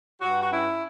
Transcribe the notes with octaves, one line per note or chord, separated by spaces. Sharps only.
G2 F#4
F#4
C#4 E4